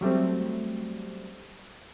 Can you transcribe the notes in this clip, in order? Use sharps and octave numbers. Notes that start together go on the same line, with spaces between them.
F#3 G3 A3 C4